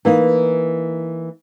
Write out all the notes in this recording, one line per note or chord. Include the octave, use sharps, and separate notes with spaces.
E3 A#3 D#4